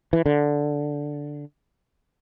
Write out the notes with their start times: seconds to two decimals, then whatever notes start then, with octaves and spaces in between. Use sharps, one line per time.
0.13 E3
0.26 D3